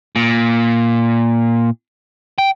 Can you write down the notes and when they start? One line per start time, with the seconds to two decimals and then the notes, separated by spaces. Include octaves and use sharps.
0.16 A#2
2.38 G5